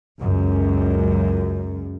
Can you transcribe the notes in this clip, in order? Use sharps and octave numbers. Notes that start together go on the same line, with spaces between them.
C#2 F#2